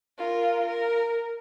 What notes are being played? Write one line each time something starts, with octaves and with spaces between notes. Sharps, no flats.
F4 A#4
A#4